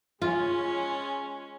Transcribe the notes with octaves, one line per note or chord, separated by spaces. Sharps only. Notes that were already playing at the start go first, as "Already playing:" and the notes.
G#3 C#4 F4